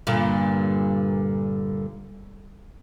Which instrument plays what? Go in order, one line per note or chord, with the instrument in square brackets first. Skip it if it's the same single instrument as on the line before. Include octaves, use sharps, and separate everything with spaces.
[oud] G2 A#2 D3